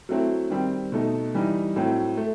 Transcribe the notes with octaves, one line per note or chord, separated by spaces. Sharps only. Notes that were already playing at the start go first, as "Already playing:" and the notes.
F#3 A3 C4 E4
D#3 G3 C4
B2 A3 D#4 A4
E3 G3 D#4
A2 F#3 C4 E4
A3